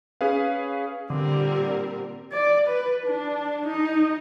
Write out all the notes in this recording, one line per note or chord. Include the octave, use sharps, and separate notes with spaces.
C#4 G#4 B4 F5
A#2 D3 G3 C4 A#4
D5
B4
D4
D#4